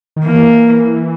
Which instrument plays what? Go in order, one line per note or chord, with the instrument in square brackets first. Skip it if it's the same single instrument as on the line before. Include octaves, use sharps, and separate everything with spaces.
[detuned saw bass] D#3
[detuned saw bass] E3 [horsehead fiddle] A#3